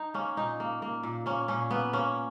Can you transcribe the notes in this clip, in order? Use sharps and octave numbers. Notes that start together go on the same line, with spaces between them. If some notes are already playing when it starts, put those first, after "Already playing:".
Already playing: D#4
A#3 C#4
A#2 D#4
A#3
A#3
A#2
A#3 C#4
A#2 C#4
A#3 B3
A#3 C#4